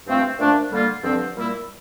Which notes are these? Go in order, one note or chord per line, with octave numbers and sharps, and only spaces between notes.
G2 F3 A3 C4 F4
A#2 F3 A3 D4
D3 G3 A#3 F4
G2 D3 F3 C4
A#2 G3 A#3 E4